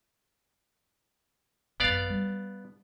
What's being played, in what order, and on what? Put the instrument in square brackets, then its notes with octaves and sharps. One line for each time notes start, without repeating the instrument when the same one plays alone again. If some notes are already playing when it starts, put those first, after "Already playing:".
[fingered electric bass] G#1 F#2 [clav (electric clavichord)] B3 D5 F5
[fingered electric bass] G3